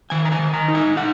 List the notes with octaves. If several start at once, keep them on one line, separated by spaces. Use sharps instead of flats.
D#3 G#5
A#5
G#5
D#3
A#5
D#4
G#5
D#4 F#5